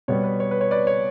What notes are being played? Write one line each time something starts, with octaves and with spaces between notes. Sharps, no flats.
B2 G3 B3 C#5
B4
C#5
B4
C#5
B4 D5
C#5